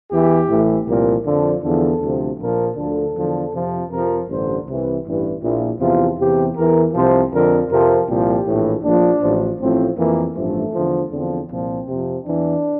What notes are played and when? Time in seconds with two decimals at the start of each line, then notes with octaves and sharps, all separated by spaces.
0.11 E2 E3 G4
0.49 A1 A2 E3
0.87 C2 A#2 F3 A#4
1.26 F2 D3 F3
1.63 E2 D3 F3 A4
2.01 D2 C3 F3
2.39 A#1 A#2 F3 A#4
2.76 D2 D3 F3 A4
3.15 E2 D3 F3
3.52 F2 C3 F3
3.90 F2 C3 F3 A#4
4.29 A1 G2 D3 C5
4.66 C2 C3 E3
5.05 A1 G2 E3
5.42 A#1 A#2 F3 E4
5.80 E2 C3 F3 F4
6.18 E2 C3 E3 G4
6.56 E2 E3 A#4
6.94 C2 C3 F3 C5
7.32 F2 D3 F3 A#4
7.69 F2 C3 F3 A#4
8.07 C2 A#2 F3 G4
8.46 A#1 A2 E3
8.83 A#1 A#2 F3 D4
9.22 A1 A2 F3
9.59 A1 A2 F3 C4
9.97 F2 E3 A#3
10.35 A1 G2 F3 A3
10.73 E2 D3 F3
11.11 E2 D3 F3 C4
11.49 C2 A#2 F3 C4
11.87 F2 C3 F3
12.25 E2 E3 D4